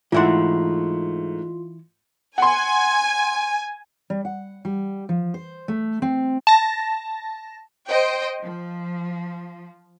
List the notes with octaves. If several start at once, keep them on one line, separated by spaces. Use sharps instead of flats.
G#2 E3 A3 E4 F4 F#5 C6
F#5 G#5 C6
G3
F#5
G3
F3
C5
A3
C4
A5 A#6
C5 D#5 G5
F3